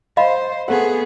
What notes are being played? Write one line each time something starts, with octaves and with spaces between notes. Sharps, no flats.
C5 D#5 F5 B5
A3 B3 G#4 F#5